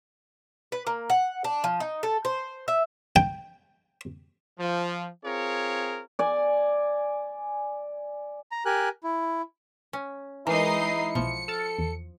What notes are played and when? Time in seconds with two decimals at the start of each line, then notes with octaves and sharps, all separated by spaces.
0.72 B4
0.87 A#3
1.10 F#5
1.44 D4
1.64 F3
1.80 D#4
2.03 A4
2.25 C5
2.68 E5
3.16 G5
4.59 F3
5.24 C4 F4 G#4 A#4 C#5
6.19 D5 G#5
8.51 A#5
8.65 G4 A#4 G#5 F#6
9.03 E4
9.93 C#4
10.47 E3 G#3 D#4 E4 A#4 C7
11.15 B1 B2 F3 C#7
11.48 A4 E6 F6 A6
11.78 E2